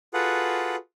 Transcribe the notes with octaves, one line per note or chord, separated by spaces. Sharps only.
F4 F#4 G#4 A4 B4 F#5